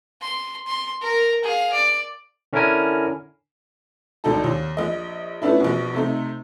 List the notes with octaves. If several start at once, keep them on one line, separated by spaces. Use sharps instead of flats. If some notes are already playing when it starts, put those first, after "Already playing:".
C6
C6
A#4
G#4 F5
D5
D3 C#4 D4 E4 A#4 G#5
G#1 D2 D4 D#4 A4
D#2
A#1 D#5
F3 A3 B3 C#4 D4 E4
A#1 B2
C3 A3 D#4